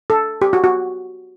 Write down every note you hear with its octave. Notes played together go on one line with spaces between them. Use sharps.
A4
G4
F#4
F#4